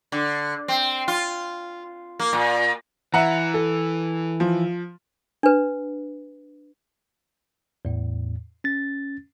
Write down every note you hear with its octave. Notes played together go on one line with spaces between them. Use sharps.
D3
C4
F4
A#3
A#2
E3 E5 F#5 A#5
A4
F3
D4 B4
E2 A2
C#4 A6